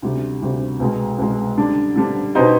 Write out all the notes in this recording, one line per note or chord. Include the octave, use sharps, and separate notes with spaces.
D2 C3 G3
D2 C3 G3
C2 B2 G#3
C2 B2 G#3
D3 G3 D4
D3 G3 D4
B2 B3 D#4 G4 C5